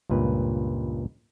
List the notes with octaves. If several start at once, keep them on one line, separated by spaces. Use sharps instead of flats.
C#2 G2 A#2 B4